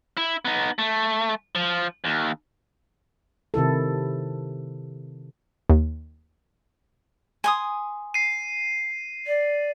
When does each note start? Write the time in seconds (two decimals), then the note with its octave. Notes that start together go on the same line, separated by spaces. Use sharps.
0.17 E4
0.45 B3 D#4
0.79 A3
1.55 F3
2.04 D#2
3.54 C3 D#3 E4 A4
5.69 D#2
7.44 G#5 C6 D#6
8.14 C7 D#7
9.26 D5